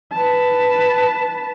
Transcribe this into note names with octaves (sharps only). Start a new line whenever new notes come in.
B4 A5